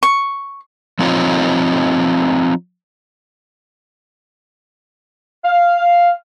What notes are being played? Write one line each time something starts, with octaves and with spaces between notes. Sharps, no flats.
C#6
F3 C4 D#4 F4 C#5
F5